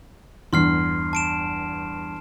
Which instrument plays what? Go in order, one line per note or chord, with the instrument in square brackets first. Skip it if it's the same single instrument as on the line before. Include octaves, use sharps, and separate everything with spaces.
[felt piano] E2 G2 [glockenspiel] C6 F6 C7
[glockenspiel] A5 D7 E7